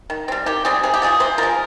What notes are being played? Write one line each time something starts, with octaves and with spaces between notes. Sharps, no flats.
D#3
G3 C4
D#3 G4
G3 C4 G#4
C3 G#4
G4
F3 G#3 G#4
C3 C5
F3 G#3 A#4